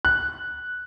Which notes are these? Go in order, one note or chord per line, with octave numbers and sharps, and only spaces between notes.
F#6